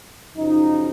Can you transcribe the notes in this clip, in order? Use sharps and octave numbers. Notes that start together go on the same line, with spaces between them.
F#2 C#3 F3 D#4